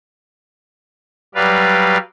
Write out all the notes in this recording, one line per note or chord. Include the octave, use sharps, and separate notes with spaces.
F#3 G3 B4 D5 F5